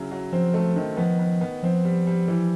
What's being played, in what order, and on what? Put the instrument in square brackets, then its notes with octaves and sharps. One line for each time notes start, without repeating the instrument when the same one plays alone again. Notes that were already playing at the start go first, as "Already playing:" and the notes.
Already playing: [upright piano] C#3 F#3 E4
F#3
[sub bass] F3 [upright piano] C4
[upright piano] A3
D#3
[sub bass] F3 [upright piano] B3
[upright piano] B3
B3
[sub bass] F3 [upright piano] C4
[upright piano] G3
G3
E3